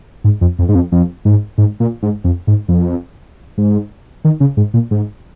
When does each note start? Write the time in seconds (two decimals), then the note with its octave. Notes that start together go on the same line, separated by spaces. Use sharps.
0.24 G#2
0.41 F2
0.59 F2
0.69 G#2
0.75 F2
0.92 F2
1.25 G#2
1.58 G#2
1.80 A#2
2.03 G#2
2.24 F2
2.47 G#2
2.68 F2
3.58 G#2
4.25 D#3
4.40 C#3
4.57 G#2
4.74 A#2
4.91 G#2